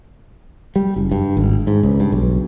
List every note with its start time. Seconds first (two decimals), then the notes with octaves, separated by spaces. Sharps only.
0.76 G3
0.96 F#1
1.12 G2
1.37 G#1
1.67 G#2
1.83 C#2
2.00 G2
2.12 B1